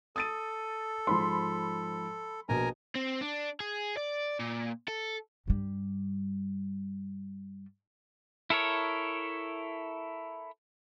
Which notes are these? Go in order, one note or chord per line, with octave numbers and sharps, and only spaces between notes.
A4 D#6 A6 D#7
G#2 F3 B5 C6
A#1 B2 A#4 G#5 A#5
C4
D4
G#4
D5
A#2
A4
G2 G3
E4 A4 A#4 C#5